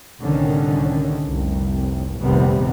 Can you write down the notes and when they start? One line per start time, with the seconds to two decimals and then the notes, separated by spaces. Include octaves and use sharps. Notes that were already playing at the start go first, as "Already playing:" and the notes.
0.20 C2 A2 D3 D#3 C#4
1.25 F1 C2
2.21 F1 A#1 C3 D#3 G3 B3